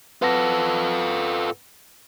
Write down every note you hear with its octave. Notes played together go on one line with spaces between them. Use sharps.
F4 A4 B4 F#5 A#6